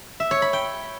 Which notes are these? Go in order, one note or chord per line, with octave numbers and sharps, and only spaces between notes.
E5
C#5
B5
G5